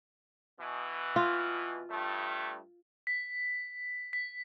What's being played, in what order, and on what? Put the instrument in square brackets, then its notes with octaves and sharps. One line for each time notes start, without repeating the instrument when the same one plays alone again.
[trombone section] B2 E3
[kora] F4
[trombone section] G2 A3
[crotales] B6
B6